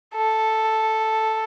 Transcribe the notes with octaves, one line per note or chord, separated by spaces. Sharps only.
A4